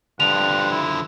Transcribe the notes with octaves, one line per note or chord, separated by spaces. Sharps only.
G2 D3 F3 F#5 F7
E4